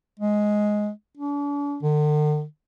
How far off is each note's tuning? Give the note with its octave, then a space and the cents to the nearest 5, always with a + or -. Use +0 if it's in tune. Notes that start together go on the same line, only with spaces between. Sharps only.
G#3 +5
D4 -40
D3 +45